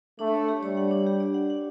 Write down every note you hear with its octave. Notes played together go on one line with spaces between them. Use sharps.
A3 D4
C#5
G4
G3 C#5
F#5
D4
G4
D5
F#5
F#5